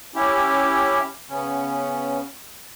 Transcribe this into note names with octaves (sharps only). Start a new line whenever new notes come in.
C#4 E4 G4
C#3 B3 C#4